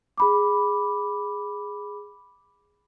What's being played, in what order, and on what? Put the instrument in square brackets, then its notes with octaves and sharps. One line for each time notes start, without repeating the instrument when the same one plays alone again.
[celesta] G#4 B5 D6